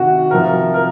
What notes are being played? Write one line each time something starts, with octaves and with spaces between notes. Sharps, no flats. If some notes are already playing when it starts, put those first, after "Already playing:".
Already playing: C3 D#3 F#4
C3 F3 A#4
A#4